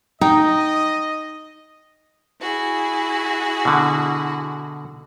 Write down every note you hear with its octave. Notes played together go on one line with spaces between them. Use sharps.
D#4 D#5 G5
E4 F#4 G#4
B2 D3